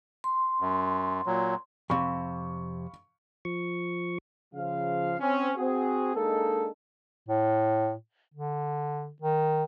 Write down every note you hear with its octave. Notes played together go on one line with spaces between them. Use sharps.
C6
F#2
A#2 F#3
F2 C3 F5 B5 C#6
F3 C#6
C#3 F3 F5
C4 C#4
C4 F#4 G#4
G#3 A#3 D4 D#4 A4
A2
D3
D#3